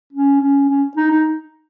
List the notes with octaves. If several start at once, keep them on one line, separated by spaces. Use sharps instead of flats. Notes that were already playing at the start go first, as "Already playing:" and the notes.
C#4
C#4
C#4
D#4
D#4